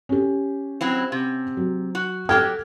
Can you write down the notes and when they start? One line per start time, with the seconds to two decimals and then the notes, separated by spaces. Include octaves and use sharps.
0.09 C#4 G4
0.81 F#3 C4 E4
1.12 C3
1.57 F#3
1.95 F#4
2.29 F#3 G4 A4 G5 F6 G#6